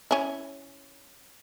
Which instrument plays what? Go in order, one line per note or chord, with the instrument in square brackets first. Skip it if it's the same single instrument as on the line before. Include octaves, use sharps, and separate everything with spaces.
[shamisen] C#4 E4